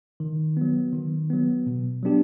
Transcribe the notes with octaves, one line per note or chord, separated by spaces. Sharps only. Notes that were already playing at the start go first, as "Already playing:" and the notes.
D#3
F#3 B3
D#3
F#3 B3
B2
F#3 B3 D4 G4